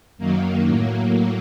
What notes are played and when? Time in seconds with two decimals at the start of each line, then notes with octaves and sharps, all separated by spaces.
0.18 F#2 D#3 F#3 A#3
0.67 A2 F#3